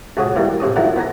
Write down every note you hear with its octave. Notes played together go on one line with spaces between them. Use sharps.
C#2 F#4 G#4 C#5 D#6
B2 E3 G3 A#3
A1 C3 C#4 D#6
D3 D#3 F3 F#3 D#4 E4
B3 B4 G#5 A#5